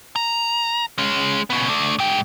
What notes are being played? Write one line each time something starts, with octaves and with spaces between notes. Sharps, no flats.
A#5
G#3 C#4
C#3 B3
A3 D4
G#2 G5